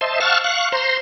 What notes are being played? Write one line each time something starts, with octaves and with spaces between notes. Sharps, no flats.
C5 D#5 E5 A5 C6
F5 F#5 A5 C#6 E6 F6
F5 C#6 F#6
C5 A#5 C6